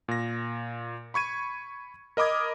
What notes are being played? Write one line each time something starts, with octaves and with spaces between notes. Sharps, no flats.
A#2 A#6
B5 C#6 G#6 D#7
A#4 D#5 B5 D6 D#6 G#6